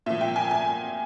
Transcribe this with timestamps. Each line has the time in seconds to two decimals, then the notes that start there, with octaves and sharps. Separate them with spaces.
0.06 A#2 F3 E5
0.21 G5
0.36 G#5
0.51 G#5